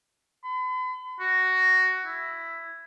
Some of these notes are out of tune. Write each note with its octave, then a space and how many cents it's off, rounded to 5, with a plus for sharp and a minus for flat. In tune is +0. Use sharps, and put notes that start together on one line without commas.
B5 +45
F#4 +10
E4 +10